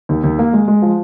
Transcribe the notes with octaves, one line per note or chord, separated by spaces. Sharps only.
D#2
D#2
A#3
G#3
G#3
F3